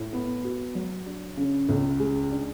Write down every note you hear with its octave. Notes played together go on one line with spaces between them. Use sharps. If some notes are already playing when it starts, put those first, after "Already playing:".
Already playing: A2
B3
F#4
F#3
D4
C#3
C#2
G#3
D4